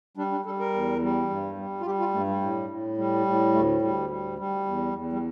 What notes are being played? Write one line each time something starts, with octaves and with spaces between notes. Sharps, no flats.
G3 D4
D4
G3 A4
A#4
E2
G3
G2
G3
F4
G3 G4
F4
G2 A3
G3
A2
A2
G3
A2
D2 A3
D2 G3
G3
G3
E2
E2
G3